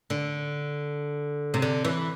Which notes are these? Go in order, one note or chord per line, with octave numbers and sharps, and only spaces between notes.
D3
C3
D3
E3